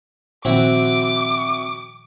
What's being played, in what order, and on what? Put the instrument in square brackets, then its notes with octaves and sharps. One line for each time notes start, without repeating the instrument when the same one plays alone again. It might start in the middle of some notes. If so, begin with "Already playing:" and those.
[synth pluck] A#2 D#3 F3 [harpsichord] C4 E4 F#4 [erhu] D6